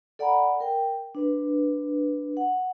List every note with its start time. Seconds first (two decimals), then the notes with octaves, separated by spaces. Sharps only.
0.19 A4 D5 F#5 G#5 A#5 B5
0.60 A#4 G5
1.15 D4 B4
2.37 F#5